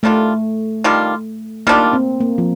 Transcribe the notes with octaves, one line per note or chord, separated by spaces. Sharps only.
D#3 G3 A3 D4 F4
D#3 G3 D4 F4
D#3 G3 A#3 D4 F4
C4
A#3
F3